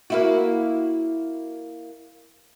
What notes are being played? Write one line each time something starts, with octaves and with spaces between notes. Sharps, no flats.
A#3 E4 F#4